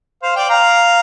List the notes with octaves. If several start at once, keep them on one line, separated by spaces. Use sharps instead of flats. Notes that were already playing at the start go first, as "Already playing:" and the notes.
C5 F5
D5 G5
F5 A#5